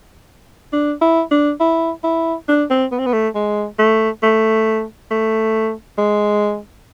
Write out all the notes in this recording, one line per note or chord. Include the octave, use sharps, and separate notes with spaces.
D4
E4
D4
E4
E4
D4
C4
B3
C4
B3
A3
G#3
A3
A3
A3
G#3